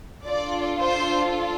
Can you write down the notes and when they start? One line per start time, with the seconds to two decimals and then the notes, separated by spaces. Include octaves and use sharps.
0.25 D4 F4 A4 D5
0.79 C5